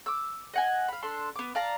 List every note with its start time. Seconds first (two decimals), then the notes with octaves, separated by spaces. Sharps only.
0.06 D6 E6
0.54 D#5 F#5 G#5
0.88 F5 B5
1.03 D4 A4 C6
1.36 B3 D6
1.55 D5 F5 A5 A#5